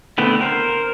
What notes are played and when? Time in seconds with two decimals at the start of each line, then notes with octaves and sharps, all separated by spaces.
0.18 D3 A3 B3 C4 E4
0.41 A#4 C5